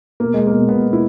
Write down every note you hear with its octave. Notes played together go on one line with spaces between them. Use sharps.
B2 A#3
B2 G#3
A#3
B2
B2 B3
B2
E4